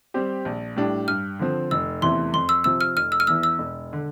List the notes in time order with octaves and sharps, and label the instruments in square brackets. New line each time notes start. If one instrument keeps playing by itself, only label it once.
[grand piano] G3 C4 G4
A#1
A2 G3 D4
[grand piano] G2 [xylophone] F6
[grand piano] D3 F3 C4
[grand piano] F1 [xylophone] E6
[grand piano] E2 C3 E3 A3 [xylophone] C6
[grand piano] F2 [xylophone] C6
[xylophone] E6
[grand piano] C3 F3 [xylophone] E6
[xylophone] F6
[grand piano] F1 [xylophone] F6
[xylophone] E6
F6
[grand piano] E2 E3 [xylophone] E6
[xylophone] E6
[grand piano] E1
D3